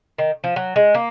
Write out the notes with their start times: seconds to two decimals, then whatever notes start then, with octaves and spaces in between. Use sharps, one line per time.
0.18 D#3
0.44 F3
0.56 F#3
0.76 G#3
0.95 A#3